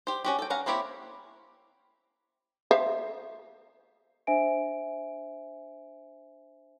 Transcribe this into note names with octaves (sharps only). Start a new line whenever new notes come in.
G4 C5
C#4 F#4 G4
A4 G5
C#4 F5 F#5 A#5
A#3 C4 E4 G4 C#5
C5 E5 F5
D4 C5 E5 G#5 D7